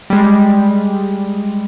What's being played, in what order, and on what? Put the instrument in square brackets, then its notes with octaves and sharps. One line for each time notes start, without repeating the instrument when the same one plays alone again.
[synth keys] G3 G#3